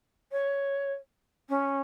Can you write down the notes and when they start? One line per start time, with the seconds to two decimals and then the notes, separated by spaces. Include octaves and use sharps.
0.32 C#5
1.49 C#4